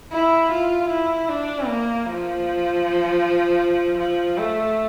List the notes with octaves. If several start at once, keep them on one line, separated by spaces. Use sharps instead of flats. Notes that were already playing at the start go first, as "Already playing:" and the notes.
E4
F4
E4
D4
A#3
F3
F3
A3